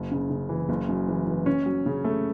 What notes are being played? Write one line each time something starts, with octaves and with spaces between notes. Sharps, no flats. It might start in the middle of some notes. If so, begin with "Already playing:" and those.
Already playing: F#1
C#3
C#3
E3
F#1
F#2
E3
E3
C#4
F#3
C#3
A3